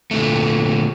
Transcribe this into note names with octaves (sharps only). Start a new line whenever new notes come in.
A#2 D3 A3